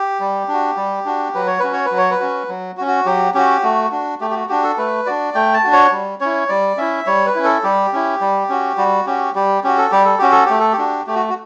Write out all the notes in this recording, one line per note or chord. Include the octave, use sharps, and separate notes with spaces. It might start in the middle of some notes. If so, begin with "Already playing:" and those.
Already playing: G4
G3
D4 F#4
G3
D4 F#4
F#3 B4
C#5
C#4 F#4 B4
C#5
B4
F#3
C#5
B4
C#4 F#4
F#3
F#4
C#4
F#4
F#3 G4
C#4 F#4 G4
A3 F#4
D4 F#4
A3 G4
G4
F#4
D4 F#4 G4
A4
A3 B4
D4 F#4 D5
A3 G5
A5
D4 F#4
C#5
G3
C#4 E4 C#5
G3 D5
C#4 E4 E5
G3 C#5
B4
C#4 E4
A4
G3 G4
C#4 E4
G3
C#4 F#4
G3 F#4
C#4 F#4 G4
G3 G4
C#4 F#4 G4
A4
G3 G4
A4
C#4 F#4 G4
A4
A3 G4
A4
G4
D4 F#4
A3 G4
F#4
F#4